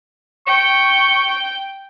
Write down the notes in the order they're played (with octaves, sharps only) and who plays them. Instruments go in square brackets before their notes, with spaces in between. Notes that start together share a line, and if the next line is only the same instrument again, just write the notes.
[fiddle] G5 [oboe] C#6